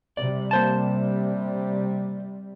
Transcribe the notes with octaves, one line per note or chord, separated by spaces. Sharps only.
C3 G3 D5
A#3 C5 A5